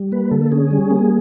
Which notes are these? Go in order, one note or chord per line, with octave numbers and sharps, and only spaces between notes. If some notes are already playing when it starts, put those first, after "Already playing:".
Already playing: G3
A#3 B4
D3 A4
A4
C#4 G#4
G3
A#3